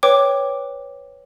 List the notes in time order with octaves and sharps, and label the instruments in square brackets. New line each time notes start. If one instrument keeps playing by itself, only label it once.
[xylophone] B4 C#5 G5 D6